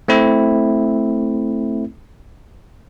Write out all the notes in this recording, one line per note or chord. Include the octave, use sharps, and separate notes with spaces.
A3 C4 E4